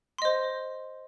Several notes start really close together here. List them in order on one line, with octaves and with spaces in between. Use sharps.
C6 D#5 C5